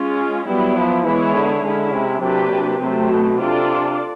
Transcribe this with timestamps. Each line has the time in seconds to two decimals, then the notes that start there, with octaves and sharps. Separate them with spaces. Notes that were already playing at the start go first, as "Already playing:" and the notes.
Already playing: G#3 C#4 F4
0.47 F#3 G3 B3 E4
0.76 F3
1.05 E3 G#3 B3 E4 G#4 C#5
1.35 D3
1.63 D3 G#3 C#4 E4
1.92 C3
2.22 C3 F#3 A#3 D4 G4 B4
2.51 C3
2.80 C3 F#3 A3 C4
3.10 B2
3.39 C3 D4 F4 A4 D5